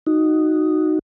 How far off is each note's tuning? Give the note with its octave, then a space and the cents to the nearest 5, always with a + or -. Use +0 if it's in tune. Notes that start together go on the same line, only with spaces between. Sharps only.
D#4 +0 F#4 +0